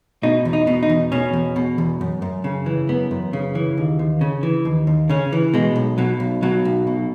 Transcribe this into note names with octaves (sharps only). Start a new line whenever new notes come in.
B2 D#4
E2
D#4
B2
D#4
E2
B2 C#4
E2
B2
E2
F#2
F#2
C#3
E3
F#2 B3
F#2
C#3
E3
D#2
D#2
C#3
E3
D#2
D#2
C#3 C#4
E3
B2 G#3
B1
B2 F#3
B1
B2 F#3
B1
B2